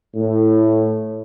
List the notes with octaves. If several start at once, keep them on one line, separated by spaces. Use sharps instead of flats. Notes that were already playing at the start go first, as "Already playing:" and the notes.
A2